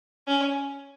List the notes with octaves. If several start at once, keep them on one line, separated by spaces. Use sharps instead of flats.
C#4